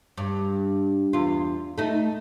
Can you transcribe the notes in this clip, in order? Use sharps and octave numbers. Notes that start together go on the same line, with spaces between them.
G2
E2 F4
A3 D#4